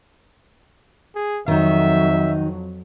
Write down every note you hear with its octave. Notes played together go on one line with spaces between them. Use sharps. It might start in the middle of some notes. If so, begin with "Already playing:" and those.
G#4
F2 D#3 F#3 D#4 E5